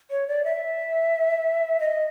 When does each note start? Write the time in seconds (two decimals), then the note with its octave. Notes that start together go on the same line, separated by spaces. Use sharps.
0.10 C#5
0.28 D5
0.44 E5
1.80 D#5